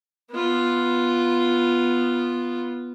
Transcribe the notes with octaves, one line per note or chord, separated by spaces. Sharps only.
B3 F4